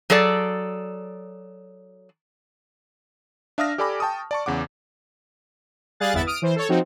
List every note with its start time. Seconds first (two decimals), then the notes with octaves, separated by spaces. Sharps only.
0.10 F#3 G#4 A4 D5
3.58 D4 E5 F5 D#6 F6 A#6
3.78 G4 A4 D5 G#5 B5 D6
4.00 G5 A5 C#6 D#6
4.31 D5 A5 C#6
4.46 E2 C#3 F#5 D6
6.00 G3 G#4 F5 F#6 A6
6.13 G1 E2 B3 E4 E5 A6
6.26 D#6 F6 D7
6.42 E3 C5
6.56 A4 C#5
6.69 F3 C4 D#4 F#4